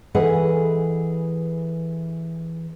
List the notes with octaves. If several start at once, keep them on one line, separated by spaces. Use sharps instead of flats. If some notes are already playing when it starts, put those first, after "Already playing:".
E3 G#4 A4 B4 D#5 F#5